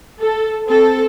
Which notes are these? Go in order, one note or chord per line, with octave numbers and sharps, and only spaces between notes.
A4
C4 A4